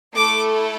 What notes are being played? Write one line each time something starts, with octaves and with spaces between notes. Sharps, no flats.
A3 E4 A4 D6